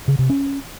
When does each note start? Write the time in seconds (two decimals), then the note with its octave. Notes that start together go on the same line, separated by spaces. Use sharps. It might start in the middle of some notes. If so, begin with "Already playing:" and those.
0.08 C#3
0.19 C3
0.30 C#4